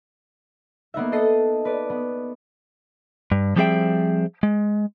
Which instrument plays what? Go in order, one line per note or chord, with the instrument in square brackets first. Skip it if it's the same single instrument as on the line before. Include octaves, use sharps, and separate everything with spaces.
[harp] A#3 B3 D#4 E5
A4 D#5 C7 D#7
B4 D5
B3
[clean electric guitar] G2
F3 G3 C4 G#4 E5 G5
G#3